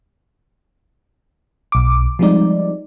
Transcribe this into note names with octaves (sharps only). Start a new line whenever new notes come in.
B1 D6
F3 G3 G#3 C4 D#4 D5